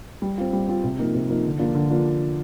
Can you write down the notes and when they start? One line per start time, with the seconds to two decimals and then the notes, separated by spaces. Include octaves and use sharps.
0.22 G3
0.38 C4 F4
0.53 G3
0.68 C4 F4
0.84 C3
0.99 F3 A#3 D#4
1.14 C3
1.29 F3 A#3 D#4
1.45 D3
1.59 F3 A#3 D4 F4
1.75 D3
1.90 F3 A#3 D4 F4